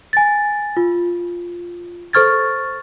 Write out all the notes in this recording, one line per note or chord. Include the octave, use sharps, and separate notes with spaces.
G#5 A6
F4
A4 C5 C#6 F6 G#6 A6